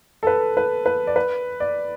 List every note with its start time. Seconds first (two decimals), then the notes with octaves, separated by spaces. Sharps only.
0.23 A4
0.27 B4
0.57 B4
0.86 B4
1.07 D5
1.16 B4
1.60 D5